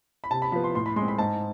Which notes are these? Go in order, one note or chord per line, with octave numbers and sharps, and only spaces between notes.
B5
C3 A5
B5
F3 B3 B5
C6
A2 C6
B5
G#3 C6
C4
B5
G#2 A5